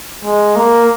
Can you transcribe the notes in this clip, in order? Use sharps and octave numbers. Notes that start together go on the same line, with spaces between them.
G#3
A#3